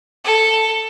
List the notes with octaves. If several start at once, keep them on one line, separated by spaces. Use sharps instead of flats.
A4